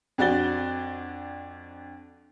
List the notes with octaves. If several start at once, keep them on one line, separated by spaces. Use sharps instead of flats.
F2 D4 F#4 D5 A6 G7